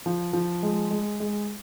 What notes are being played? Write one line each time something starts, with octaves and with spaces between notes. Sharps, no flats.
F3
F3
G#3
G#3
G#3